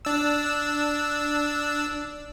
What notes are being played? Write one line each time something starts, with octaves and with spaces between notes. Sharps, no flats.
D4 E6